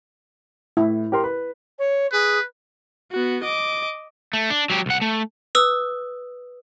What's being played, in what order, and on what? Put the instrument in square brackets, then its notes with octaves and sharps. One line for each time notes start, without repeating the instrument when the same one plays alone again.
[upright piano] A2 [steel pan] E4
[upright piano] G4 A#4 C6
B4
[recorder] C#5
[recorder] G#4 [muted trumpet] B4
[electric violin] B3 F#4
D#5 D6
[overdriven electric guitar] A3
D4
F#3 G4
C2 F#5
A3
[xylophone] B4 D#6 E6